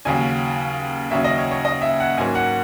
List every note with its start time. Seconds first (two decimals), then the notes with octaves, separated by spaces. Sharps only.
0.05 D#2 C#3 F#3 C#4 G#5
1.11 D#2 C#3 F#3 C#4 E5
1.24 D#5
1.38 C#5
1.51 C#5
1.65 D#5
1.82 E5
2.00 F#5
2.18 G#2 F#3 A#3 C#4 G#5
2.35 F#5